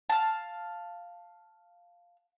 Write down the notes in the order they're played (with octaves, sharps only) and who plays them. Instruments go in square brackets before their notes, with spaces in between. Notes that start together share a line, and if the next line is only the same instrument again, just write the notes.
[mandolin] F5 A5